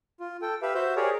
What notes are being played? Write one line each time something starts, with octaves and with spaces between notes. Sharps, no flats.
F4
A4 G5
G4 B4 E5 F5
F#4 C5 E5 G6
G4 G#4 A#4 C#5 D5